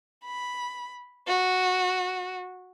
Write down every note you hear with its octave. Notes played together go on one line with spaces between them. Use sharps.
B5
F#4